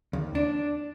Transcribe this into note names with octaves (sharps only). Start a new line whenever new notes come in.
D#2
D4